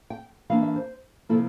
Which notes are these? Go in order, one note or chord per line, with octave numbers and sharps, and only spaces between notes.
G5
E3 A#3 D4 F5
E5
C5
C3 F3 A#3 E4 A4